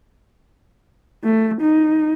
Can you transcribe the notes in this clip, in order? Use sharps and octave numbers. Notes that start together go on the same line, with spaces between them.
A3
D#4